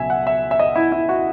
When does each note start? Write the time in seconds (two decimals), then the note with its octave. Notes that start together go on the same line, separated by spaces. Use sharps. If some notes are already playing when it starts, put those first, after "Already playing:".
Already playing: C#2 B2 F#3 E5 G#5
0.10 F#5
0.27 E5
0.51 E5
0.60 D#5
0.76 E4
0.92 E4
1.09 F#4